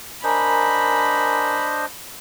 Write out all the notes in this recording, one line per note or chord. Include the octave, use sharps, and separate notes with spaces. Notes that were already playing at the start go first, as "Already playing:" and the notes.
D4 A#4 C5 D#5 G#5 A#5 B5